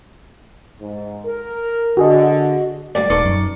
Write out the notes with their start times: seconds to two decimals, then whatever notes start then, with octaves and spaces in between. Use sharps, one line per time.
0.81 G#2
1.25 A#4
1.97 D3 F#4 G#4 D#5
2.95 A#1 A#2 G3 D5
3.10 D#1 B3 D#4 A4 C#6 D6 C#7
3.25 F#2